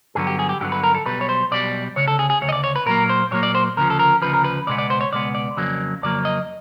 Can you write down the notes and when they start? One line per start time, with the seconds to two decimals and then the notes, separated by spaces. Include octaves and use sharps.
0.15 G2 D3 F#3 B3 G#4
0.27 G4
0.39 G#4
0.49 G4
0.60 G2 D3 F#3 B3 G4
0.72 B4
0.84 A#4
0.95 A4
1.06 B1 B2 G3 B4
1.21 C#5
1.29 C5
1.51 B1 B2 G3 D5
1.96 D2 C#3 C#5
2.08 A4
2.19 G#4
2.30 G#4
2.41 D2 C#3 C#5
2.49 D#5
2.52 D5
2.64 C#5
2.76 B4
2.86 A#2 F#3 A#3 A#4
3.10 C5
3.31 A#2 F#3 A#3 C#5
3.43 D5
3.55 C5
3.77 D2 C#3 F3 A#4
3.90 A4
3.99 A#4
4.22 D2 C#3 F3 B4
4.34 A#4
4.44 B4
4.67 C#2 B2 G#3 B3 D5
4.78 D5
4.90 C5
5.01 C#5
5.12 C#2 B2 G#3 B3 D5
5.35 D5
5.57 F2 C#3 F#3 A#3
6.02 F2 C#3 F#3 A#3 D5
6.25 D#5